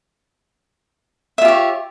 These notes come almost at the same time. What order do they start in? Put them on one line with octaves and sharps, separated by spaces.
E5 F4 G4 C#5